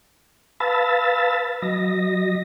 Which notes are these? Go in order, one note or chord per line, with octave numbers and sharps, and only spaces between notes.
B4 F5 A5 B5 E6 A6
F#3 D#5 A#6